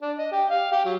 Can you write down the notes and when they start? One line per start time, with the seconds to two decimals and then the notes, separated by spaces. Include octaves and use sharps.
0.02 D4
0.18 D#5
0.32 G4
0.50 F5
0.72 G4
0.85 F#3